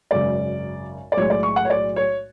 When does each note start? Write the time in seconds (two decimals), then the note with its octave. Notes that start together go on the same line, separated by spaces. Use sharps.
0.11 G#1 F#2 C#3 D5
1.12 D5
1.17 B1 A2 G#3 C#5
1.30 D5
1.43 C#6
1.56 F#5
1.65 C#5
1.70 D5
1.96 C#5